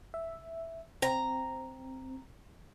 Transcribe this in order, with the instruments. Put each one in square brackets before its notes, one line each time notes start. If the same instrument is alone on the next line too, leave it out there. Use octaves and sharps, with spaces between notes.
[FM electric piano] E5
[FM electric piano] C4 [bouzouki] A#5